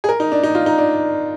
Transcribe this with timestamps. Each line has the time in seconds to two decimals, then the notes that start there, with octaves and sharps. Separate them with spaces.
0.04 G#4
0.09 A#4
0.20 D#4
0.32 D4
0.43 D#4
0.55 F4
0.66 D#4
0.78 D4